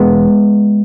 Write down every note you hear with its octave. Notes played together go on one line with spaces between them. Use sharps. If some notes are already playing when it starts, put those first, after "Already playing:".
Already playing: E1 G#3 B3